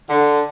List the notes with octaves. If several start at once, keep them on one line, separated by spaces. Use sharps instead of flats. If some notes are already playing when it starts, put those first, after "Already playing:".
D3